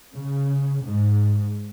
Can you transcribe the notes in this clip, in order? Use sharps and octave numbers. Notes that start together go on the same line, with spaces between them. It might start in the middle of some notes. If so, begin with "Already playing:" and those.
C#3
G#2